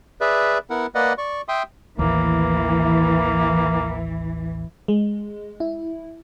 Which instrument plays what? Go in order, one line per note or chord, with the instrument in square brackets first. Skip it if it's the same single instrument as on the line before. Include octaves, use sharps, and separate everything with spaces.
[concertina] G#4 B4 D5 E5
B3 E4 A#4 F#5
A#3 B4 D5 D#5 F#5
D5 C#6
E5 G5 C6 D#6
[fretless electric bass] A1 D#2 [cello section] E3 [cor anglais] A#3
[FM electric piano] G#3
E4